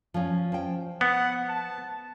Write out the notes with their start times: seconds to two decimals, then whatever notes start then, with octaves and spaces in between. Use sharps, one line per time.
0.14 F3 C#4
0.52 F3 G5
1.01 B3 F#5
1.49 A5